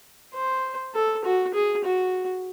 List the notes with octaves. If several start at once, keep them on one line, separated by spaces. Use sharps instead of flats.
C5
A4
F#4
G#4
F#4